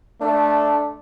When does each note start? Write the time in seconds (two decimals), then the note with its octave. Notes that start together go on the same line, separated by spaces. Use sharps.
0.21 A3 D4